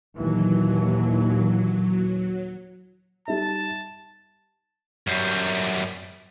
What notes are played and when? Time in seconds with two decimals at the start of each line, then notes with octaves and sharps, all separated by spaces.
0.15 D#2 A#2 E3 F#3
3.28 G3 D#4 E5 A5
5.07 F#2 G3